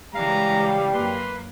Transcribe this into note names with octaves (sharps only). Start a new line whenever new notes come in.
C#3 E3 G3 G#3 F5 A#5
F#2 A#3 B4 C6